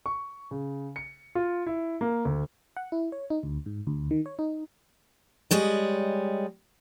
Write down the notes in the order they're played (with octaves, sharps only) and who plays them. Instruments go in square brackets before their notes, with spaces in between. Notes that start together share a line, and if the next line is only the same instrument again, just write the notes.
[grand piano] C#6
C#3
C#7
F4
E4
A#3
D2
[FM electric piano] F#5
E4
C#5
D#4
D2
G#2
D2
D#3
C#5
D#4
[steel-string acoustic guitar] G3 G#3 C#5 D#5